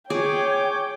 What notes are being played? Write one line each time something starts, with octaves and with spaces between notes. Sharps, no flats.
G#4 C#5 G5 D6